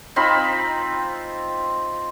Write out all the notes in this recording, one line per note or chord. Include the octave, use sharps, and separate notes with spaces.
C4 D#4 F4 B5